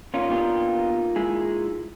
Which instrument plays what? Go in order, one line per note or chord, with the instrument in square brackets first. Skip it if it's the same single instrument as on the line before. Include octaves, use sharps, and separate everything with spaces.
[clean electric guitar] A#3 D#4 F4 [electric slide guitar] C#4
[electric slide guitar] B3 D4 G4
G#3 E4 G#4